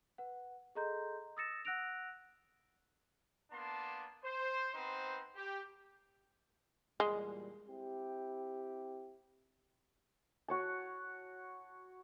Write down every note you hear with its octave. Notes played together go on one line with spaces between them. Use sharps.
B4 F#5
G#4 A4 D#5 A#5 C6 G6
D#6 E6 A6 A#6 C#7 E7
F#5 E6 F#6 A#6 D7 F7
A#3 B3 D4 A5 C6
C5
B3 C4 D#4 B4 C5
G4
E2 A#2 G3 G#3
C4 E4 G4
F#4 C#5 A5